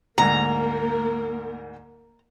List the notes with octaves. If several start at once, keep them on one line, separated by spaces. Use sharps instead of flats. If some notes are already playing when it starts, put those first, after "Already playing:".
D2 G#2 A#3 A#4 A#5